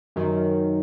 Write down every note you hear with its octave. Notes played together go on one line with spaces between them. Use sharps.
F#2 D#3 F#3